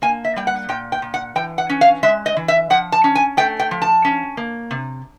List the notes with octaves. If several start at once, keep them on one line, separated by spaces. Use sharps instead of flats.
A#3 G#5
E5
G3 G5
F#5
A#2 G5
G5
A#2
F#5
E3 G5
F#5
C#4
F5
G#3 E5
D#5
E3
E5
F3 F#5
A5
C#4
G#5
A3 G5
G5
F3
A5
C#4
A#3
C3